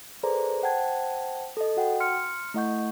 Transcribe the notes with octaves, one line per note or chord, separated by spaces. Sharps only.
G#4 A4 B4 C5 D5 A#5
C5 F#5 G5 A5 G#6
A4 D#5
F#4 F#5 G5
C6 F6 C#7
A3 E4 D#5 F#5 C#6 G6